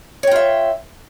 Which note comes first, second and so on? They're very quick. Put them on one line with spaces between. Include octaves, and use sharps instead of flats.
C#5 G5 F4 E5